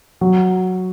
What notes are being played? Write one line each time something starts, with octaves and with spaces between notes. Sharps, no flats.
F#3